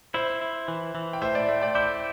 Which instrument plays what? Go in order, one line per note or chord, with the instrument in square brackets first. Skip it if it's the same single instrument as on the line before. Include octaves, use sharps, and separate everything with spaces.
[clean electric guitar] E4 [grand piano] C5 E5
[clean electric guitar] E4
E3
E3
[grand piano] G5
[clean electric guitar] A2 [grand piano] C5 E5
[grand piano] D5
[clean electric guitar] A3
[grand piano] D5 G5
[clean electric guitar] E4 [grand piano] D6 G6